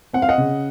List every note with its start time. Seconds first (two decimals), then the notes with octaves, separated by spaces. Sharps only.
0.13 C4 F#5
0.22 F5
0.29 D#5 F#5
0.38 C#3